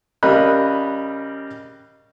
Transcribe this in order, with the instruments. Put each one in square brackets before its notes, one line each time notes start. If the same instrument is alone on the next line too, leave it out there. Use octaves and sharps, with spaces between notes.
[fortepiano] C#3 G3 A#4 D#5 B5 F#6